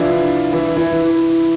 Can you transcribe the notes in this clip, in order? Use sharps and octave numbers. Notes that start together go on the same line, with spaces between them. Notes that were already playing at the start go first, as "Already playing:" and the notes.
Already playing: E3 F3 D4 E4 F4
E3 E4
E3 E4